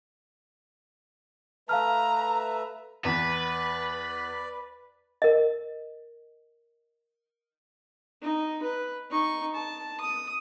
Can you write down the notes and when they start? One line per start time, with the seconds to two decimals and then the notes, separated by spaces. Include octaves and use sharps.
1.69 A3 B4 E5 F5 A5 A#5 F6
3.05 E2 B4 D5
5.22 A#4 D#5
8.22 D#4
8.62 B4
9.10 D#4 C#6
9.55 A5
10.01 D#6